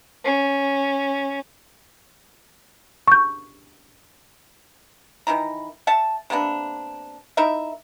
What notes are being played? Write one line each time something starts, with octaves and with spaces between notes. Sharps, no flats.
C#4
C#6 G6
D#3 E3 E4 A#5
E5 F#5 A5
C3 A#3 B3 D4
D#4 E4 A#4 E5